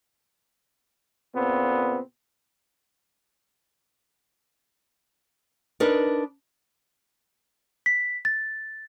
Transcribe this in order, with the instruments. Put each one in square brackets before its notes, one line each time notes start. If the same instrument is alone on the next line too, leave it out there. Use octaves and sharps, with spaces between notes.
[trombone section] A#2 C#3 B3 C4
[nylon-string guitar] D4 D#4 A#4 B4
[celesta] B6
A6